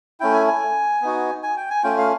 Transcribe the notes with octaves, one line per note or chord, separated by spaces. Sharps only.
A3 C#4 E4 G5
G#5
G#5
B3 D#4 F#4
G#5
G5
G#5
A3 C#4 F4 G5
F5